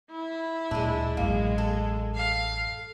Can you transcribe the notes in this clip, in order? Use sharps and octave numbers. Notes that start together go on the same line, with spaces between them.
E4
D1 A#2 G#3 D4
A1 F#2 G#3 A#3
A4
F5